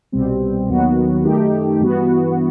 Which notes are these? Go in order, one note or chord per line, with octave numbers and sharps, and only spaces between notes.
C2 B2 G3 C4
D#2 D#3 F#3 B3 F#4
F#2 D#3 A3 D#4 G4
G2 E3 B3 F#4